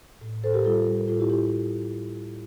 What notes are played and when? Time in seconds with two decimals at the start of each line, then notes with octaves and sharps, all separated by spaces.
0.21 A2
0.44 A2 A4 C5
0.54 G4 A#4
0.65 G3 F4 A4
0.88 G3
0.98 A#4
1.08 A2 F4 A4
1.20 E4 G4
1.30 A2 E4 G4